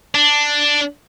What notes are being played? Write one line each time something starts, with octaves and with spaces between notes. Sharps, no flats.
D4